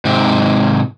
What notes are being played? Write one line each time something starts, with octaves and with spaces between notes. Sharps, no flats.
G#2 C3